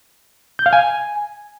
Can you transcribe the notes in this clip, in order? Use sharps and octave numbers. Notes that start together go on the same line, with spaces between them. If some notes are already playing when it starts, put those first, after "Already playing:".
G6
F5
G#5